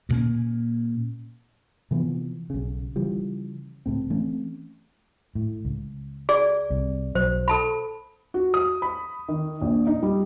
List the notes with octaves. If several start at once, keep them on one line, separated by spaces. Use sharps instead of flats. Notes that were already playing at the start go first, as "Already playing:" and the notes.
G2 A#2 A#3 C#4
C3 E3 F3 B3
B1 C#3
C#3 E3 F3 G3
C#2 A2 C4
E3 A3 C4 C#4
A2
C#2
G#4 D5
C2 C3
B1 F#3 C5
A4 A5 B5
F#4
D#6
B5
D#3
A#1
D#4
G3